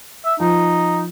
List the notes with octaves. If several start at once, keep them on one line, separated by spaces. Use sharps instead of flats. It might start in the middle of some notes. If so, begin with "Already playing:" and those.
E5
F3 D#4